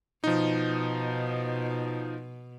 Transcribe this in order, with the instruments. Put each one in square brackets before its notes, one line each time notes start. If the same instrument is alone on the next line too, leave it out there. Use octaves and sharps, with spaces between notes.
[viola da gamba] B2 [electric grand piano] F3 D#4